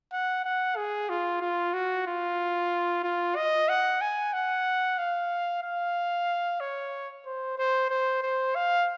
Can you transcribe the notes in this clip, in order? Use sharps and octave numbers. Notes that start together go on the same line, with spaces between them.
F#5
F#5
G#4
F4
F4
F#4
F4
F4
D#5
F#5
G#5
F#5
F5
F5
C#5
C5
C5
C5
C5
F5